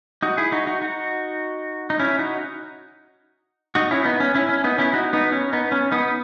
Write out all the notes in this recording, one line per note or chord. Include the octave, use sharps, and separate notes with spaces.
D#4 F#4
E4 G#4
D#4 F#4
D#4 F#4
D#4 F#4
D#4
C#4 E4
D#4 F#4
D#4 F#4
C#4 E4
B3 D#4
C#4
C#4 E4
C#4
B3 D#4
C#4 E4
D#4 F#4
B3 D#4
C#4
B3 D#4
C#4
B3 D#4